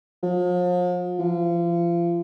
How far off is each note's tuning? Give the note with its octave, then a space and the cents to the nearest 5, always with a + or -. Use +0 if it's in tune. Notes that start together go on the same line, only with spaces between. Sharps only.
F3 +40
F3 -35